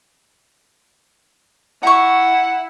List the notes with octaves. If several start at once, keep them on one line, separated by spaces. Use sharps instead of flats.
E4 F#5 A#5 C#6